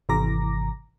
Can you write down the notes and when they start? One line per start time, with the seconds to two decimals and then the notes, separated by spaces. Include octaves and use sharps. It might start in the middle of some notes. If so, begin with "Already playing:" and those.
0.09 G#1 C3 E3 A#5 D6 A#6